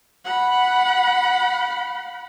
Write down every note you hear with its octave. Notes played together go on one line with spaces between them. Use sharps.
F#5 B5